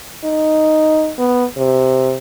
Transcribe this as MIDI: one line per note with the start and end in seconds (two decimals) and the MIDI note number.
0.24 1.12 63
1.19 1.45 59
1.58 2.17 48